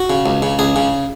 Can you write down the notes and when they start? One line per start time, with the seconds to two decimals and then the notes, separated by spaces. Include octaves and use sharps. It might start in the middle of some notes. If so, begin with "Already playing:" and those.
Already playing: F#4
0.10 C#3
0.26 C#2
0.42 C#3
0.59 C#2 G#4
0.76 C#3